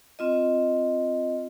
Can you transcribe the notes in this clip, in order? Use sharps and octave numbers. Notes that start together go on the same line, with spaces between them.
C4 F4 D#5